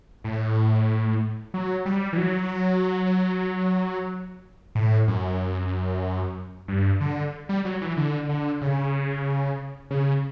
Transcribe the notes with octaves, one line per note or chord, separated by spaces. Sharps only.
A2
F#3
G3
E3
F#3
A2
F#2
G2
D3
G3
F#3
E3
D3
D3
C#3
C#3